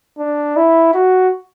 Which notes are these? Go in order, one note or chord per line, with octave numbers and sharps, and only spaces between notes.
D4
E4
F#4